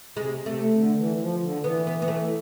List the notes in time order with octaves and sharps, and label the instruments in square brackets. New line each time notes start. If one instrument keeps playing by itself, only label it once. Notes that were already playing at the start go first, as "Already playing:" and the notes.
[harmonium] C3 [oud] G#3
[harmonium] C3 [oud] A3
[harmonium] D3
E3
F3
D3
[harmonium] E3 [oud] B3
[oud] B3
B3
A3